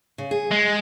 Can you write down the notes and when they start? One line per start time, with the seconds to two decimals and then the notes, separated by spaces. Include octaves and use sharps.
0.18 C#3
0.31 G#4
0.51 G#3